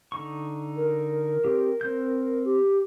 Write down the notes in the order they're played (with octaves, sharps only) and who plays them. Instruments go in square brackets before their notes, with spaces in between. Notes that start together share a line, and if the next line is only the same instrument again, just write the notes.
[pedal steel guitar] D3 D#4 C#6
[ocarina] A#4
[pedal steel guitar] C4 G4
C4 G6
[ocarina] G4